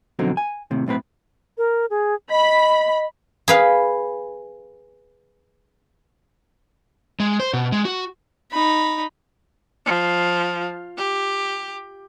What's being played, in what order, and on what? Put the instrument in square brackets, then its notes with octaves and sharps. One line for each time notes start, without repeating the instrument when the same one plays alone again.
[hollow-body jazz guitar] F2 B2 D3 F#3 C4 D#4
G#5
D#2 A2 C3
B1 A2 C4 B4
[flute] A#4
G#4
[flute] D#5 [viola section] B5
[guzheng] G#4 B4 F5
[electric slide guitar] G#3
C5
B2
G#3
F#4
[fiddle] D#4 B5
[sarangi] F3
G4